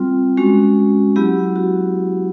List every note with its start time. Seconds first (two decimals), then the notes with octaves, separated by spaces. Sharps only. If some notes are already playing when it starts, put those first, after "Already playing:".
Already playing: G3 C4 F4
0.37 G#3 C#4 F#4
1.16 F#3 B3 E4 G4
1.56 F#4